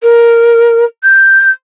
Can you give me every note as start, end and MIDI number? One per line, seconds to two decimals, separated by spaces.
0.02 0.84 70
1.03 1.49 91